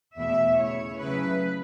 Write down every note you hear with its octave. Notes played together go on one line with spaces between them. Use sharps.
E2 B2 A3 E4 E5
C#3 A3 E4 C#5
C#3 F#3 A3 E4 B4